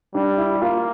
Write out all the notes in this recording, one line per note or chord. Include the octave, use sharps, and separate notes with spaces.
G3 D4
E4
G4
A#3 F4